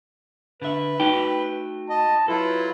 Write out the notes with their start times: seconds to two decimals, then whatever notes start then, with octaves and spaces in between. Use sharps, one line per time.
0.62 D3 B4 E5
1.00 A3 D#4 F#4 G5
1.90 D#5 A5
2.28 F#3 E4 F4 A4 B4